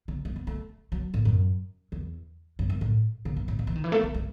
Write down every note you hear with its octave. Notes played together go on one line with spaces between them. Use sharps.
C#3
G#3
B3
A3
F#3
A2
F#2
E2
F#2
F#2
A2
C#3
F#2
A2
B2
E3
D#3
E3
A3
B3
G#3